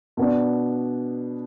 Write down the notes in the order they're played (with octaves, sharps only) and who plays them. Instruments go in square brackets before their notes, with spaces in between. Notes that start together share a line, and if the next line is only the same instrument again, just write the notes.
[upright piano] B2 B3 D4